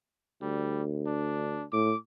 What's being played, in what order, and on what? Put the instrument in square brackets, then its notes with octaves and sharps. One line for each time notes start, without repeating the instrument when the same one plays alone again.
[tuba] D2 [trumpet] G3
[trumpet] D4
[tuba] A2 [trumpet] D6